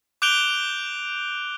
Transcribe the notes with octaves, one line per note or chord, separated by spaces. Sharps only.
D6 F#6 G6 D7 F7 G7